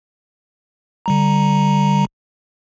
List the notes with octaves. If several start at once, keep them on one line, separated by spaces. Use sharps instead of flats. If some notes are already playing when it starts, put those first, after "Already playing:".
D3 G3 A#5